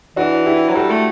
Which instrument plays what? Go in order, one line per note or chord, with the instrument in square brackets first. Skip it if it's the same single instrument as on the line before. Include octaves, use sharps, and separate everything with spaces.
[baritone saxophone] E3 [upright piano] D4 F#4
[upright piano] E4 G4
[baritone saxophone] F#3
[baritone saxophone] G3 [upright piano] F#4 A4
[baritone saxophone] A3